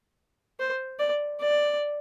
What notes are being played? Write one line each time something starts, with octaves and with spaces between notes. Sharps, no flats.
C5
D5
D5